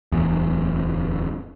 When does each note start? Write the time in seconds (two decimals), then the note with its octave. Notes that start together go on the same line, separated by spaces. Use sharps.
0.12 D1 E2